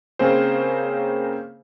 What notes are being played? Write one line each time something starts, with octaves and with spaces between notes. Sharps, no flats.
C#3 A#3 C4 C#4 G#4 C5